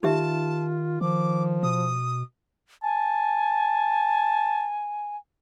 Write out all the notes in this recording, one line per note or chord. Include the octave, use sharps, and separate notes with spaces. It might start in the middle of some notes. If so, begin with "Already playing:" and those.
D#3 D#4 F4 G4 E5 A5
D#3 F3 D6
B2 D#6
G#5 A5